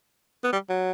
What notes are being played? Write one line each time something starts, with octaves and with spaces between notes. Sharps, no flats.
B3
G3
F#3